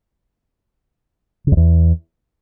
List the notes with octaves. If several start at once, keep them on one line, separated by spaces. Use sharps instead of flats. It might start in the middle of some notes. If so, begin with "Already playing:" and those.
C#3
F2
E2